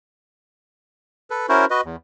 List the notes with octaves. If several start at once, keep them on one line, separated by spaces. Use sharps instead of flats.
A4 B4
C#4 E4 F#4 A#4 C5
F#4 B4 D#5
E2